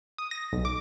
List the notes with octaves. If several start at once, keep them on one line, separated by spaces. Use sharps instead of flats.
D#6
A#6
B1
D6